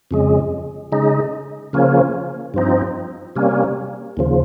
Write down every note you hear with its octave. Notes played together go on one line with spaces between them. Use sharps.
F2 C#3 G#3
C#3 G#3 D#4
C#3 F3 A#3 C#4
G2 F3 C4 D#4
C3 G3 A#3 C#4
D#2 C#3 F3